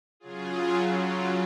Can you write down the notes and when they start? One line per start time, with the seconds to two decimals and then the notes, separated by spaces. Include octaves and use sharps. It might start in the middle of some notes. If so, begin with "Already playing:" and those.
0.20 C#3 F#3 F4 G#4
0.99 C#4 F4